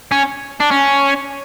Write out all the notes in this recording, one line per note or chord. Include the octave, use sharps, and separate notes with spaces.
C#4
D4
C#4